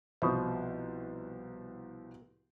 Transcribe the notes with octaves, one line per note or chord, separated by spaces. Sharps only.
C2 B2 F3 C5